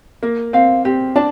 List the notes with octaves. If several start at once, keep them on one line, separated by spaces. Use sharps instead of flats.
A#3 A#4
C4 F5
C4 G4
D4 A5